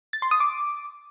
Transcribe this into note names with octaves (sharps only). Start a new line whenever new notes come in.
A6
C6
D#6
D6